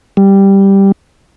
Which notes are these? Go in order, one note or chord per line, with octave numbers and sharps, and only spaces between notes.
G3